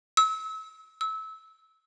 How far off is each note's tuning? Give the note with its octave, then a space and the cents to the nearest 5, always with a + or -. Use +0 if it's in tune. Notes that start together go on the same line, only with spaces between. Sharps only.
E6 -35
E6 -25